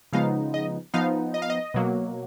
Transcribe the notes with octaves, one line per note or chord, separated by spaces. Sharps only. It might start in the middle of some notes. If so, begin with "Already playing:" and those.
C#3 F3 G#3 B3 D#4 F5
D#5
F3 B3 D#4 F5
D#5
F5
D#5
B2 F#3 A#3